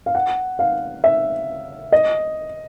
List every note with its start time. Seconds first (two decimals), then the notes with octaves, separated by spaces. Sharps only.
0.06 F5
0.15 F#5
0.59 F5
1.04 E5
1.92 D#5